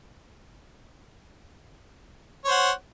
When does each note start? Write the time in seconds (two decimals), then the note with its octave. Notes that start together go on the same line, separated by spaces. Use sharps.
2.45 C#5
2.48 C5
2.51 F#5